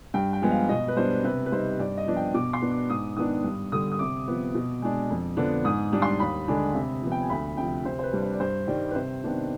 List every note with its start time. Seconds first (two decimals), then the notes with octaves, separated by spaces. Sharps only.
0.14 G2 G5
0.33 G5
0.42 F3 G#3 B3
0.51 F5
0.69 B2 D#5
0.88 B4
0.96 G3 B3 D4 C5
1.24 C3 B4
1.46 B4
1.52 G3 C4 D#4 C5
1.79 G2 D5
1.97 D#5
2.06 F3 B3 D4
2.16 G5
2.34 B2 D6
2.53 C6
2.62 B3 D4
2.71 D6
2.89 G#2 D#6
3.16 D#3 B3 D4 D#6
3.44 G2
3.72 D3 G3 D#6
3.92 D#6
3.99 C3 D6
4.28 F3 B3
4.55 B2
4.82 G#3 D4
5.10 F2
5.37 D3 F3 B3 D4
5.64 G#2 D#6
5.92 G3 D4
6.02 C6
6.19 D#2 B5
6.48 D3 G#3 D4
6.75 C3
7.02 F3 B3
7.12 G5
7.21 G#5
7.30 D2 B5
7.57 C3 F3 G5
7.85 C3 C5
7.99 C5
8.03 B4
8.13 G3 D4
8.22 C5
8.33 D5
8.40 G2 C5
8.67 D#3 G3 D5
8.91 B4
8.95 C3 C5
9.23 D#3 B3 D4